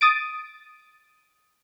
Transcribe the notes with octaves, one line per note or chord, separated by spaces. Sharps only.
D#6 A6 D7